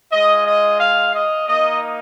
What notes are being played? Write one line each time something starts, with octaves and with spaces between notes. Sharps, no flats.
G#3 F4 D#5
D#5
F5
D#5
A#3 D#4 D#5